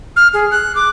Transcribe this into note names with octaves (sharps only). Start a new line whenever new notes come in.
F6
G#4
F#6
D6